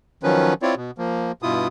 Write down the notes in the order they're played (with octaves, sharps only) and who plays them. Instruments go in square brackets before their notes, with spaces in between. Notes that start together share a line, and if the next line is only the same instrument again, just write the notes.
[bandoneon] D#3 F3 F#3 C#4 B4
C4 E4 F4 C#5 D5
B2
F3 A#3
G2 B2 E4 F4 D#6